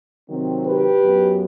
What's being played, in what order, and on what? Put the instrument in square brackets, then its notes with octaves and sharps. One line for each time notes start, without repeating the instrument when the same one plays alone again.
[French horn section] C3 D#3 F#3 C4
G4 B4
F#2 F#3 B3